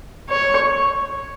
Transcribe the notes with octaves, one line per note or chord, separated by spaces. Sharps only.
C#5